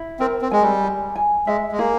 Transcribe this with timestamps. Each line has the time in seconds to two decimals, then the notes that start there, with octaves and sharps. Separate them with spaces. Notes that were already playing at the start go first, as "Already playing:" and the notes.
Already playing: E4
0.20 C4 A#4
0.42 C4
0.51 G#3 G#5
0.62 G3
0.84 G#5
1.16 G#5
1.47 G#3 E5
1.72 G#3
1.78 A#3 G#4